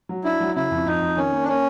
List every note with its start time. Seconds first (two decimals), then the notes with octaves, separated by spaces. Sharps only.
0.09 F#3
0.25 D4 E4
0.40 F#3
0.55 C#3 E4
0.71 F2
0.86 F2 D#4
1.02 F2
1.17 D#3 C#4
1.32 A#3
1.43 D4
1.48 A#3 C#4